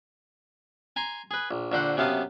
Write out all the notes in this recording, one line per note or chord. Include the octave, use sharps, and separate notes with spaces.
G#5 A#5 C6
G#4 B4
A#1
A#1 D3 C5 F#5
F#2 C3 B3 F5 A5 D#6